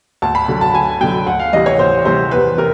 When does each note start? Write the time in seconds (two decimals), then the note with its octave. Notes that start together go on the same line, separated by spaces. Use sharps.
0.22 D2 A5
0.35 B5
0.48 D3 F#3
0.61 A5
0.74 D2 G#5
1.01 D3 F#3 G5
1.26 D2 F#5
1.39 F5
1.53 C3 E3 G3 D#5
1.66 C#5
1.79 D2 C5
2.05 C3 E3 G3 C5
2.31 E2 B4
2.58 C3 A#4